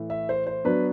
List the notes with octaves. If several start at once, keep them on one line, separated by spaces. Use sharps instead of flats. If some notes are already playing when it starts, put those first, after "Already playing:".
Already playing: A2 E3 A3
E5
C5
C5
F#3 B3 D4 B4